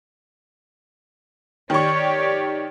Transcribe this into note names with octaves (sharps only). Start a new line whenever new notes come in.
D#3 G4 C#5 D5 C#6